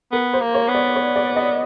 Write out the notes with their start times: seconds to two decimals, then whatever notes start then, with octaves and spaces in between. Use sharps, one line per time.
0.12 B3 A#4
0.33 C5
0.40 A#3
0.54 C#5
0.68 B3
0.75 D5
0.96 C#5
1.16 D5
1.36 D#5